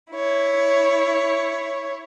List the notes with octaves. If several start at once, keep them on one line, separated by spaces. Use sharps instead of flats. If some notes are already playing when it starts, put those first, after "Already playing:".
E4 C#5